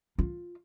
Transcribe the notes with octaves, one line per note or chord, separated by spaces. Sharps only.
F4